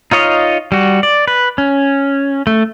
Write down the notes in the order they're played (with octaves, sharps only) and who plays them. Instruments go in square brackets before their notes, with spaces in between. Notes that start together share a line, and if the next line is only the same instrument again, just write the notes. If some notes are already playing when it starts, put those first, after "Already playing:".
[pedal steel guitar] D#4 F4 C#5 D#5 F5
G3 F#4
D5
B4
C#4
A3